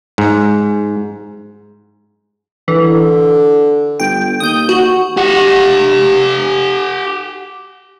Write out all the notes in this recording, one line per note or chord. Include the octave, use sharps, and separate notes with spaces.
G#2
D3 E3
G1 G5
D#2 D#6 G6
F#4
G4 F#5